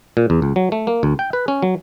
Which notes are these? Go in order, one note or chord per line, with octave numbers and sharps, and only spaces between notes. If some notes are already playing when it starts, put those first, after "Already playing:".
A#2
E2
C#2
F#3
A3
A#3
D2
G5
B4
C#4
F#3